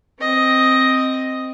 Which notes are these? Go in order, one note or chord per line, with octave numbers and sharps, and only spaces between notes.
C4 D#5